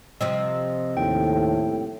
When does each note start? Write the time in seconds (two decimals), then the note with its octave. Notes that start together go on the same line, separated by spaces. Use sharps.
0.21 C3 F3 C4 D#5
0.97 D#2 A2 G5